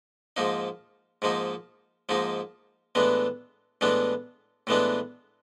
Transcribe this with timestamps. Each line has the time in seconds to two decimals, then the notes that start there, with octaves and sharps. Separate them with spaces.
0.37 G#2 F3 A#3 D#4
1.22 G#2 F3 A#3 D#4
2.09 G#2 F3 A#3 D#4
2.95 A2 E3 G#3 B3 D4
3.81 A2 E3 G#3 B3 D4
4.67 A2 E3 G#3 B3 D4